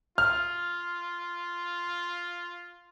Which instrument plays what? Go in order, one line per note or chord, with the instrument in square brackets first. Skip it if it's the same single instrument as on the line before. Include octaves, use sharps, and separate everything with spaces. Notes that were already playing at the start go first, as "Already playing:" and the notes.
[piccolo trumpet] F4 [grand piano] F6